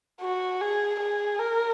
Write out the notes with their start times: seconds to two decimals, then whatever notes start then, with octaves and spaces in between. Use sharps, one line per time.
0.21 F#4
0.61 G#4
1.00 G#4
1.39 A#4